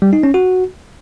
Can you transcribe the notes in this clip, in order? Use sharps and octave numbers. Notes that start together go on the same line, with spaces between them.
G3
D#4
C#4
F#4